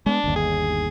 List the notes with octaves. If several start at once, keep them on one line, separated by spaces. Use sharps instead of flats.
G#3 B3 D4
G1 D#2
G#4